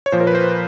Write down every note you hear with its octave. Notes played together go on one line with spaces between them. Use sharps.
C#5
A#2 F3 C5
A#4
B4
C5